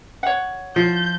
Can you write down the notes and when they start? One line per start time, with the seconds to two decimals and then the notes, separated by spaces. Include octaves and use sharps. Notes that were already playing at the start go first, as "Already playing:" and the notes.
0.23 C#5 F#5
0.76 F3 G6